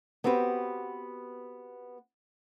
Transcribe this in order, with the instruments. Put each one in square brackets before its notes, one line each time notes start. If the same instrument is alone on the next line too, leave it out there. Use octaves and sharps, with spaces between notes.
[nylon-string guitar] B3 C4 F#4 G4 B4